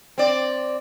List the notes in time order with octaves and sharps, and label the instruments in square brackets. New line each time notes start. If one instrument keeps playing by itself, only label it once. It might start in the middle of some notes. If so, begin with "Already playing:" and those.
[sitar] C4 D5